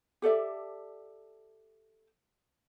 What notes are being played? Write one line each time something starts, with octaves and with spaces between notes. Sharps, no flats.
G4 A4 D5 E5